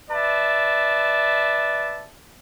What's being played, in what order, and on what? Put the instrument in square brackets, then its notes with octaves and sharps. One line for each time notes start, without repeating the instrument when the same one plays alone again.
[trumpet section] B4 D5 E5 A5